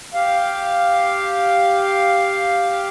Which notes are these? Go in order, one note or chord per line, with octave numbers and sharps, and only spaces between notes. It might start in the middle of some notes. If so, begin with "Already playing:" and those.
G4 F5